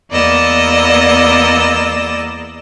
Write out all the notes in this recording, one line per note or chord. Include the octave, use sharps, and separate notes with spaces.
E2 A#3 B3 D5 D#5 E6